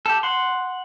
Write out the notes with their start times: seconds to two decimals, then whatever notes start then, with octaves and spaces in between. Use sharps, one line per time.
0.06 G4 A4
0.23 F#5 C6